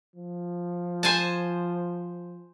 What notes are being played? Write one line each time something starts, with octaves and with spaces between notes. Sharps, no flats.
F3
C5 G#5 A5